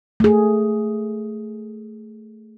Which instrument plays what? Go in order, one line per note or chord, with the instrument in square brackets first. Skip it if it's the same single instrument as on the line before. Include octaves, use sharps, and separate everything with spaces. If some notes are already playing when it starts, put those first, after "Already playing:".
[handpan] A3 G#4